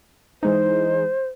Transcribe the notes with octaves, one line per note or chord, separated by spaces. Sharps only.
E3 G#3 D#4 C5